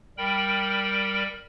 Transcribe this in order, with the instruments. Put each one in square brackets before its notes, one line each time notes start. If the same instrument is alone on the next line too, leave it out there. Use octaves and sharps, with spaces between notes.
[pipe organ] G3 A#4 G5 B5